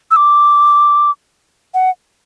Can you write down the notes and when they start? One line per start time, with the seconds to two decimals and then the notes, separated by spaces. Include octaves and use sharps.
0.11 E6
0.16 D6
1.74 F#5